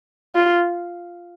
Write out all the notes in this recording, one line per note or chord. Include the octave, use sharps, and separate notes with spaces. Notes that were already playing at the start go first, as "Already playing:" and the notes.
F4